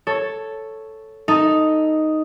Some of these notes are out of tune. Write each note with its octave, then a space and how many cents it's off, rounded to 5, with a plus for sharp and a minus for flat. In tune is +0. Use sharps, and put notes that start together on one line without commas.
A4 +0 C#5 +0
D#4 +0 A4 +0